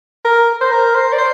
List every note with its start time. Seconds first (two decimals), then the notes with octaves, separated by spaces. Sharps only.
0.25 A#4
0.61 C5
0.71 A#4
0.95 C5
1.13 D5
1.18 C5